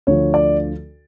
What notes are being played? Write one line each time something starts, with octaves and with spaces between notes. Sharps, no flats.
D2 D3 F3 C#5
D5